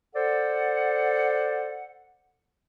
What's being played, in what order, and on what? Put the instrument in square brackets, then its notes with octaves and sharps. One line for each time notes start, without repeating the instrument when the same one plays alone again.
[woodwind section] A4 C5 D5 F#5